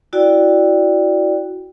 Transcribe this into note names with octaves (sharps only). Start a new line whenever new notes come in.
E4 F#4 D5 G5